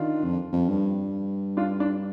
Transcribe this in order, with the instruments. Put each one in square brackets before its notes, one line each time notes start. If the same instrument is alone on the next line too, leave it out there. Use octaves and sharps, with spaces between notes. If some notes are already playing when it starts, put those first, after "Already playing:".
Already playing: [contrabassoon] D#3 [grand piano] D4 F4
[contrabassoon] F2
F2
G2
[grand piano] D4 F4
D4